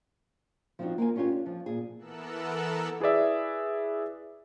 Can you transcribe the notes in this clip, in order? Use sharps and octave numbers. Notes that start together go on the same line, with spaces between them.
F3 C4 D4 D#4 F#4
A#3 F4 A#4 G#5
C#4 D4 F4 G4 C#5
D4
F2 F3
A#2 G#4
E3 B3 A4 A#4 E6 F#6
E4 G#4 B4 D5 E5